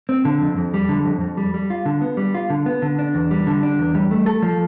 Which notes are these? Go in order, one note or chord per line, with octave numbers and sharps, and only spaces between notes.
C4
D3
F2
F2
G3
D3
F2
F2
G3
G3
F4
D3
B3
G3
F4
D3
B3
D3
D4
E2
G3
D3
D4
E2
G3
A3
A4
F3